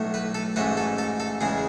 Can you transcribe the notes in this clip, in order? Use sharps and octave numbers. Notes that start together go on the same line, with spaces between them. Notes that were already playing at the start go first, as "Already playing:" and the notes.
Already playing: B1 A2 F#3 A3
B4
A4
A1 G#2 F#3 A3 B4
A4
A4
A4
E2 C#3 G#3 G#4